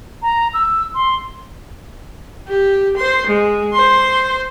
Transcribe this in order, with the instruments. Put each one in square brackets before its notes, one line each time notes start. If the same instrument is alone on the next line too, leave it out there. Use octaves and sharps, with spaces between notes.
[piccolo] A#5
E6
C6
[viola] G4
C5 C6
G#3
C5 C6